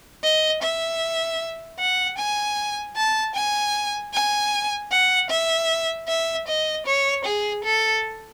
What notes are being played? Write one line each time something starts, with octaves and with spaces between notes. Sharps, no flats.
D#5
E5
F#5
G#5
A5
G#5
G#5
F#5
E5
E5
D#5
C#5
G#4
A4